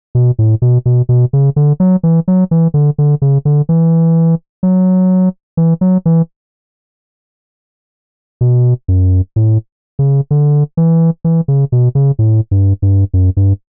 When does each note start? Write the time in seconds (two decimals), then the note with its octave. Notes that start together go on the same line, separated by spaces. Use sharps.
0.15 B2
0.39 A2
0.62 B2
0.86 B2
1.09 B2
1.33 C#3
1.56 D3
1.80 F#3
2.03 E3
2.28 F#3
2.51 E3
2.74 D3
2.98 D3
3.22 C#3
3.45 D3
3.69 E3
4.63 F#3
5.57 E3
5.81 F#3
6.06 E3
8.41 B2
8.88 F#2
9.36 A2
9.99 C#3
10.31 D3
10.77 E3
11.24 E3
11.48 C#3
11.72 B2
11.95 C#3
12.19 A2
12.51 G2
12.82 G2
13.14 F#2
13.37 G2